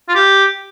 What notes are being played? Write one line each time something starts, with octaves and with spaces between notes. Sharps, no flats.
F4
G4